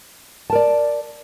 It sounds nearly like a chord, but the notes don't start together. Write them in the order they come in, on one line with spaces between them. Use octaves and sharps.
A5 A#4 D5